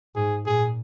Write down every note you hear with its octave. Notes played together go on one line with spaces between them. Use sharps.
G#2 G#4
A#2 G#4